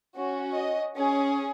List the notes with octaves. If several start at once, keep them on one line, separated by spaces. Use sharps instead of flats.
C#4 F#4
D#5
C#4 G#4